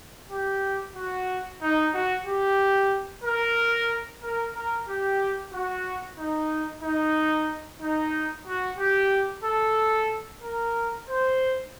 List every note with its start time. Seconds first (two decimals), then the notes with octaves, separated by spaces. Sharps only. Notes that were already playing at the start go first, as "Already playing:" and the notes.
0.30 G4
0.95 F#4
1.61 D#4
1.94 F#4
2.26 G4
3.24 A#4
4.23 A#4
4.55 A#4
4.88 G4
5.53 F#4
6.18 D#4
6.83 D#4
7.80 D#4
8.46 F#4
8.78 G4
9.44 A4
10.42 A#4
11.08 C5